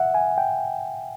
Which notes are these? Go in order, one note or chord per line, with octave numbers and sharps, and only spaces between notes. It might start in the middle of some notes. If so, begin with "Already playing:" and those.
Already playing: E5 F#5
G#5
G5